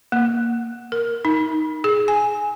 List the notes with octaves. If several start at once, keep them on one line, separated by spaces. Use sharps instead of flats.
A#3
A#4
D#4
G#4
G#5